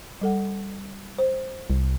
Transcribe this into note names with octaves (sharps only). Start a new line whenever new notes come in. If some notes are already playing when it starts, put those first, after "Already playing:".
G3 A4 F#5
C5
C2